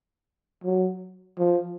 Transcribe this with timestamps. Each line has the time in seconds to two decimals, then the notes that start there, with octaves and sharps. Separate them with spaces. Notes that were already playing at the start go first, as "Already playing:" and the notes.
0.64 F#3
1.39 F3